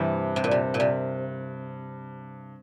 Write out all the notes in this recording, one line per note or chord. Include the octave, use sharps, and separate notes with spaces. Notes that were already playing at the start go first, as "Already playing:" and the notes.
Already playing: G2 C3 E3
C3
A#2
C3
A#2
C3